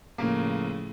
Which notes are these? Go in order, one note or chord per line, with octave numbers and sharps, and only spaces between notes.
A2 C#3 F3 A#3